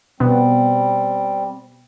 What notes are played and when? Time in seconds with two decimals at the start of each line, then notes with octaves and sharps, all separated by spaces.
0.20 B2 G3 B3 C4